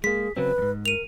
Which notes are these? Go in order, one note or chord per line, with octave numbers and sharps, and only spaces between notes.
G#3 A#3 G#4 B6
C#3 F#3 C4 B4
F2 G#2
A#4 D#7 F7